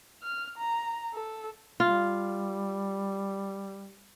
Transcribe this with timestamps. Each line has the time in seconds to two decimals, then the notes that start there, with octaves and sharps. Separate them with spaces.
0.23 F6
0.58 A#5
1.14 A4
1.80 G3 F4